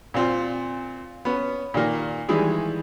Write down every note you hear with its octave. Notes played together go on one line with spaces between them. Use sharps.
A#2 C4 F4
B3 C#4
A#2 D#3 A#3
D#3 E3 G3 G#3 E4 G#4